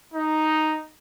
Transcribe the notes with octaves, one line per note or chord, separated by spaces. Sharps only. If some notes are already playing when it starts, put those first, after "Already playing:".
D#4